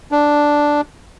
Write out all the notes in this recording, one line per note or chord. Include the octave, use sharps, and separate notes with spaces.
D4